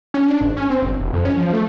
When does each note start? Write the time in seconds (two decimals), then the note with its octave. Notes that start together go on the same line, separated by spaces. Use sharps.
0.14 C#4
0.28 D4
0.41 G#1
0.57 C#4
0.70 C4
0.83 G1
1.00 E1
1.13 F2
1.25 C#4
1.37 F3
1.53 A3